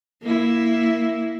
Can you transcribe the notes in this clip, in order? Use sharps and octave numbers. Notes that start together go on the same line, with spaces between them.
A#3 E4